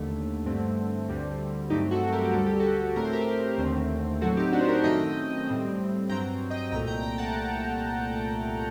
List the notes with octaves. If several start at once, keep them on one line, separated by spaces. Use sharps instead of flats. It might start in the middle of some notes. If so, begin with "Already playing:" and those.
Already playing: D#2 D3 A3
G2 D3 A3 C4
D2 D3 G3 C4
G2 F#3 A3 C4 D#4 G4
F#4 A4
G4 A#4
D2 D3 G3 A4
G4
F#4 A4
A2 A3 C4 A#4
C5
G4 A#4
D#2 D3 A3 C4
A2 F#3 C4 F#4 A4
D#4 G4
D4 F#4
C5
G4 A#4
F#2 D#3 A3 C4 D#5 G5
A2 G3 C4
G2 F#3 C4 G5 A#5
D#5 G5
C2 A#2 A3 G5 A#5
G5 A#5
G5 A#5
F#5 A5